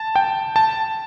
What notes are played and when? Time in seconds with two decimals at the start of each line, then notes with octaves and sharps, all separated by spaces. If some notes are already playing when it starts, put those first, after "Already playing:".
Already playing: A5
0.16 G5
0.56 A5